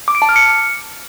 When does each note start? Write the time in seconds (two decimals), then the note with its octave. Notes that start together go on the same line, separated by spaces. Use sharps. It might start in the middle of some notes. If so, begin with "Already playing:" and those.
0.08 D6
0.15 D7
0.22 A5
0.29 F6
0.36 C#7